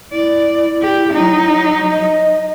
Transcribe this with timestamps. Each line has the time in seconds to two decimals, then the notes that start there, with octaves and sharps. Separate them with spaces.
0.12 E4 D5
0.82 G4
1.13 F#3 D#4
1.91 D#5